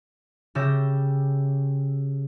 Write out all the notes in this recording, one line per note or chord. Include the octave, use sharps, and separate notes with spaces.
C#3 G4 E5 G5 A6 A#6